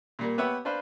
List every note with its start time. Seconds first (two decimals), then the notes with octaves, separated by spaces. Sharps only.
0.19 A#2 G3 A#3
0.38 B3 G4 B4 C#5 E5
0.65 D4 B4 C5 F5